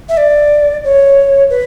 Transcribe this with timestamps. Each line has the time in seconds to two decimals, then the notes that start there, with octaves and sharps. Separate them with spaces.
0.09 E5
0.17 D5
0.84 C#5
1.50 B4